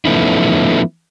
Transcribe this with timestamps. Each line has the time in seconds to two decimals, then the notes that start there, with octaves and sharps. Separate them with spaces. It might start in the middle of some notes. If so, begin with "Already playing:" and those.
0.05 F3 A3 B3 C#4 D#4 E4